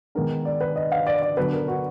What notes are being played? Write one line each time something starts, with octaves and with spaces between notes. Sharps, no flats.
D#3 G#3 B3 D#4 A#4
D5
B4
D#5
F5
D5
D5
D3 F#3 B3 D4 B4
A#4
F#4